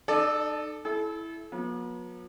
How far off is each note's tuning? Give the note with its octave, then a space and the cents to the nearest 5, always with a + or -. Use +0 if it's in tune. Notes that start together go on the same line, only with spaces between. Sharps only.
D#4 -35 A4 -10 D5 +20
E4 +0 A4 -35
F#3 -45 B3 -45